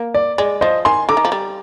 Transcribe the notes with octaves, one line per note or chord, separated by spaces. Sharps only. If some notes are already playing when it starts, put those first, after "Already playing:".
Already playing: A#3
D5
G#3 D5
F3 C5 D#5
D#3 G#5 C6
D3 A#5 D6
D#3
F3
G3